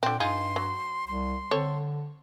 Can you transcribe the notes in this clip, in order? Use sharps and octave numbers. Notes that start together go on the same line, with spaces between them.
A#2 D3 C4 G5
G2 D#4 F4 G#4 C6
F#3
C2 C6
D3 C4 A4 C#5